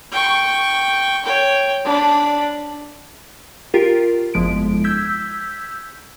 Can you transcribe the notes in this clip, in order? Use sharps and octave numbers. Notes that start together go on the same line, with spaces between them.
G5 C#6
C#5 G5
D4 B5
F4 G4 A#4
G1 F2 F3 G#3 E4 D7
E6 G6 G#6 B6